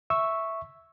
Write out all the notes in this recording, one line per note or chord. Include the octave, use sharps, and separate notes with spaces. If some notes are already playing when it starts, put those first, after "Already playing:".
E5 C#6 E6